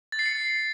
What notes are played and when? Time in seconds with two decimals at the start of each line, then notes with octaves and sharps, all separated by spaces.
0.12 A6
0.19 C7
0.26 C#7